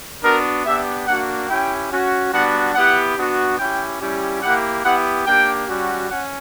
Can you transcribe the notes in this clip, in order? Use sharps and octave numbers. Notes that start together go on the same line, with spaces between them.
B3 D4 F#4 A#4
B3 D4 G4 E5
A#3 D4 F#4 F#5
C#4 E4 G4 G5
C#4 F#4
G3 B3 D4 F#4 F#5
B3 E4 G4 F#5
B3 D4 F#4
C#4 E4 G4 G5
G3 C#4 E4 G4
A#3 E4 G4 F#5
B3 E4 G4 F#5
A#3 D4 G4 G5
G3 C#4 F#4
C#4 F#5